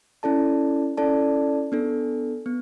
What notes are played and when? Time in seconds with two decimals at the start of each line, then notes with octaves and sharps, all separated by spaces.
0.23 C#4 E4 A4 D5 A5
0.97 C#4 E4 A4 D5 A5
1.72 B3 D4 A4
2.46 B3